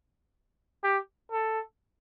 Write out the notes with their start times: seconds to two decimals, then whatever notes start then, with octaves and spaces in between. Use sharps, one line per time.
0.83 G4
1.31 A4